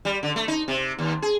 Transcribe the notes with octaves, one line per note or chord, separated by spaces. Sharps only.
G3
D3
A3
D#4
C3
D#2
G#4